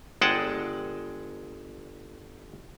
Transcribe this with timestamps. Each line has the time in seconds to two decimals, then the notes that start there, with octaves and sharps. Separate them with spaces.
0.21 G1 G#3 G#4 F#5 G5 A5